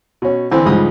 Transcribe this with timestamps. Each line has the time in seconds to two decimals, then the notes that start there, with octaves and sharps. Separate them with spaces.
0.22 B2 C#4
0.51 D3 E3 C4
0.66 C#2 G2 C#3 F3 D#4 D#6